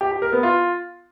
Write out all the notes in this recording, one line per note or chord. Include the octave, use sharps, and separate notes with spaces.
G4
G4
A#4
B3
F4